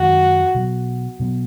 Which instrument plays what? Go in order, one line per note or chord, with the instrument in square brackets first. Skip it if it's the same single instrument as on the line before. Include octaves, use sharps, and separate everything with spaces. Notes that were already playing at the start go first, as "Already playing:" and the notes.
Already playing: [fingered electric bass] F#2 D#3 G#3 [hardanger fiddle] F#4
[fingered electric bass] B2 F#3 B3
B2 F#3 B3